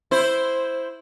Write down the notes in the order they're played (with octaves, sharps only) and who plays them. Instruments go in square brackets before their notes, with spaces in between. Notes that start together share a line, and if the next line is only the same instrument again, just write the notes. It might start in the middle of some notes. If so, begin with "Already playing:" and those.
[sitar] E4 C5